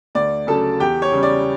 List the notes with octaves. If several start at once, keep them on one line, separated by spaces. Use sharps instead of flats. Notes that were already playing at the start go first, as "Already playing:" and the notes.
D2 D5
C#3 F#3 A4 A5
E2 G4 G5
C#5
C#3 G3
D5